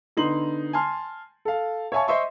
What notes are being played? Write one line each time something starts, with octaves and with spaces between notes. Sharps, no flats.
D3 B3 D#4 C6 F#7
G#5 A5 C6 F6
A4 F5
C#5 E5 F5 G#5 A5 C#6
C5 D#5 E5 C6 C#6